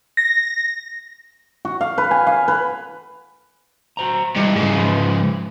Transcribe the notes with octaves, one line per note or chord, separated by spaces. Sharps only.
A#6
F#4
F5
B4
G#5
F5
B4
F#4 C5 A#5
G2 E3 G#3 D#4
G#2 C#3
F3 B4